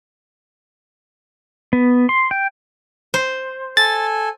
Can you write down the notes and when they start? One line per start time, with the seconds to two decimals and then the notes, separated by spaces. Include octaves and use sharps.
1.73 B3
2.09 C6
2.31 G5
3.14 C5
3.77 A4 G#5 A6